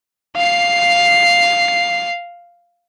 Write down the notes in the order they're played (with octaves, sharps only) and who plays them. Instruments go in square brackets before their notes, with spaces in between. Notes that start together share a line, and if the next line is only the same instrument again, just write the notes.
[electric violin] F5 C7